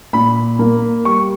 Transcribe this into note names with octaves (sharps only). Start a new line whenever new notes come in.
A#2 B5
A#3
G3 C#6